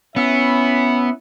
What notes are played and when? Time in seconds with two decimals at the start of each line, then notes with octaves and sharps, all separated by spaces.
0.16 B3 C#4 E4 E5